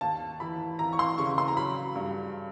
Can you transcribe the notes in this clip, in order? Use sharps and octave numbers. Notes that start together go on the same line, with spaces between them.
D#2 A5
E3 B5
E3 A#5
C#6
C6
C#3 C#6
C6
A#5
F#3 B5
G2